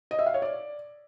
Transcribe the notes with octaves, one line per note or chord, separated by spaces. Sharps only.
D#5
E5
F5
C#5
D5